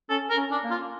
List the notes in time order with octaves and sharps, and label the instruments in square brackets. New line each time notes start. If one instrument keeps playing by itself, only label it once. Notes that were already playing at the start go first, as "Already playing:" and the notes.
[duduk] C#4 [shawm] A4
[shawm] A#4
[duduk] C#4
[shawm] D4
[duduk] A#3
[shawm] F4